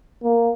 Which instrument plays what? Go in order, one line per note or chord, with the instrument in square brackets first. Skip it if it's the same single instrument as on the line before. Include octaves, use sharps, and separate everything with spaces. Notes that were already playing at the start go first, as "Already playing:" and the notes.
[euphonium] A#3